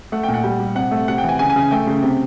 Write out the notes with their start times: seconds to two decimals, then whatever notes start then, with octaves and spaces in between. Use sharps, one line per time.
0.12 A3 F#5
0.23 G5
0.28 A#2
0.34 F#5
0.44 G3
0.60 G3
0.75 C3 F#5
0.91 A3
1.08 C3 F#5
1.18 G5
1.24 E3 G#5
1.39 C#3 G#5
1.50 G#5
1.56 C#3
1.71 A3 G5
1.87 C#3
2.02 C3